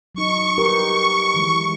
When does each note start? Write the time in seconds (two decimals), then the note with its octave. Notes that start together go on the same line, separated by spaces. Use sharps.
0.15 F#3 D#4 C#6
0.58 G4 A#4 B4
1.34 D#3 E3 G#3